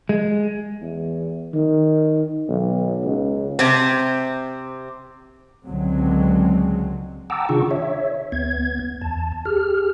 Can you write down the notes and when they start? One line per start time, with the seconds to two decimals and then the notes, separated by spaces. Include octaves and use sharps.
0.09 G#3
0.82 E2
1.54 D#3
2.49 B1
3.04 C#2
3.59 C3 C4
5.64 C#2 D3 F#3 G#3 C4
7.30 F#5 G5 A5 A#5 D6 E6
7.49 C3 D#3 D4 F4 G#4 C#6
7.71 C#5 E5
8.32 D2 B3 G#6
9.02 E2 A5
9.45 G4 G#4 F6